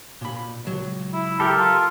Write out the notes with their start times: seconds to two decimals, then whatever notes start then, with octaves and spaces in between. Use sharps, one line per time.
0.21 A#2 B5
0.65 C#2 F#3
1.14 E4
1.40 G4 A4 A#4
1.59 F4